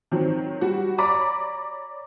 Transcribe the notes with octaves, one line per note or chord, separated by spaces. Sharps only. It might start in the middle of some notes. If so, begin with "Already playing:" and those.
D#3 F#3 C4
G3 F#4
C#5 D5 A#5 B5 D6 B6